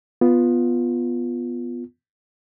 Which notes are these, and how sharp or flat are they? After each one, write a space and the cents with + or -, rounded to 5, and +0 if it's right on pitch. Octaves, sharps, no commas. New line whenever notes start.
B3 +0 F4 +0